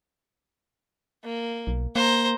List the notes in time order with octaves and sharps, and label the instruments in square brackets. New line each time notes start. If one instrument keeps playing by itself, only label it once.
[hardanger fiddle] A#3
[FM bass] B1
[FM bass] A#3 [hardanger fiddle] C5 A#5